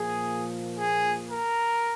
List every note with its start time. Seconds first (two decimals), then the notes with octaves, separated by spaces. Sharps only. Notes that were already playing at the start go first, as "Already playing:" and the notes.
Already playing: A#2 F3 A#3 G#4
0.77 G#4
1.30 A#4